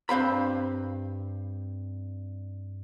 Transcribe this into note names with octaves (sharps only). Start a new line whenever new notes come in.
G2 C4 F5 B5